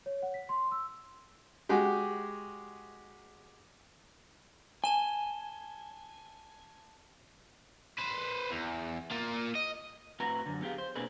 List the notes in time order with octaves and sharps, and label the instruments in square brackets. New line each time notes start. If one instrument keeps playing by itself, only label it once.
[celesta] C#5
F#5
B6
C6
E6
[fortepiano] G#3 F#4 G4
[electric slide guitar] G#5 [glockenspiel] A5 E7 G7
[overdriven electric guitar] B4 C5
E2
A#3 F4
D#5
[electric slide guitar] A2 C4 F#4 B4 A#5
F#2 D3
B3 F4 G4 G#4 F5
C5
B2 A#3 C4 D4 G#4 B4